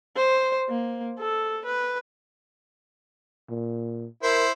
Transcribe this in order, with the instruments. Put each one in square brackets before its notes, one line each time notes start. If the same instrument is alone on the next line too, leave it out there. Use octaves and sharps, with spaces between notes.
[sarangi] C5
A#3
A4
B4
[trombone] A#2
[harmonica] E4 C5 [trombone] A#4